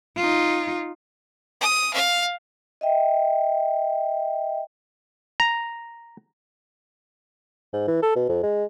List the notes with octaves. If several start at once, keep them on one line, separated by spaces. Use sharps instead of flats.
D#4 F4
D#6
F5
D#5 E5 G5
A#5
G#2
E3
A4
B2
F2
G#3